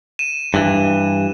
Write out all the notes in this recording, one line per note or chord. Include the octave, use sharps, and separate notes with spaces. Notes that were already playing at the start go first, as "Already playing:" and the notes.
D#7 E7
G2 E3